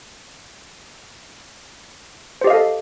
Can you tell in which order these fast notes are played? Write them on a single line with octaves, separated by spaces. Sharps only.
C5 G4 D#5 F5 A4